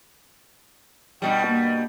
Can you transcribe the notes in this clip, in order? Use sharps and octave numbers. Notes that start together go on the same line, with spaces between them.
G2 B2 G3 G5
A#3